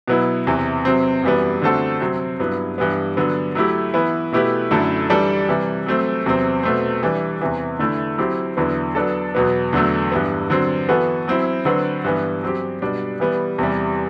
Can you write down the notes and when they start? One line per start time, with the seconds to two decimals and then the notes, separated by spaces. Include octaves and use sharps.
0.08 B2 F#3 B3 E4
0.47 E2 C3 E3
0.85 C3 F#3 C4
1.23 F#2 E3 G3 B3
1.62 D3 A3 C4 F#4 A4
2.01 C3 F#3 C4
2.40 G2 F#3 B3 E4
2.78 G2 E3 B3
3.17 D3 F#3 B3
3.55 F#3 A3 E4 G4
3.94 E3 B3 E4 B4
4.32 B2 A3 E4 G4 B4
4.71 F#2 D3 A3 E4 A4
5.09 E3 G3 D4 A4
5.49 C3 E3 G3
5.86 F#3 A3 C4
6.26 E2 C3 F#3 C4
6.63 B2 A3 C4
7.03 E3 G3 D4
7.41 E2 C3 E3
7.79 D3 A3 E4
8.18 F#3 C4 E4 G4
8.57 E2 D3 F#3 B3 E4
8.95 F#3 B3 D4 A4
9.35 E2 B2 F#3 B3
9.73 E2 D3 F#3 A3
10.12 G2 E3 B3
10.50 D3 F#3 C4
10.89 E3 B3 F#4 A4
11.28 F#3 C4 E4
11.65 D3 F#3 C4 F#4 B4
12.04 G2 E3 B3
12.43 F#3 C4 G4
12.82 B2 G3 D4
13.20 E3 G3 B3
13.58 E2 C3 E3 G3